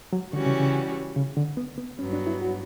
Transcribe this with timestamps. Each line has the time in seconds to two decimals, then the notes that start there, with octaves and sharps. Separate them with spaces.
0.13 F#3
0.33 D3 E3 G3 C#4 F#4
0.46 C#3
0.60 C#3
1.16 C#3
1.37 D3
1.57 B3
1.78 B3
1.99 G2 F#3 B3 C#4
2.13 D4
2.27 E4
2.41 F#4